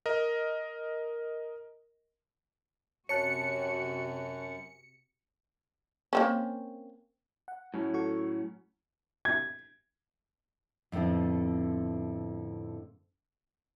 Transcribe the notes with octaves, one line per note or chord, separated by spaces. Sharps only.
A#4 D#5
F#2 C3 F#4 C#5 A5 F#6 C#7
A#3 C4 C#4
F#5
A2 F#3 C#4
F#4 A4 C#6
G#6
F2 A2 D3 B3 C4